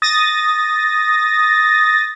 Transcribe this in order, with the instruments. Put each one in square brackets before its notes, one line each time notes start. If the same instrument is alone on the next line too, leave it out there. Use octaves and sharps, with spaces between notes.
[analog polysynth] D#6 A6 A#6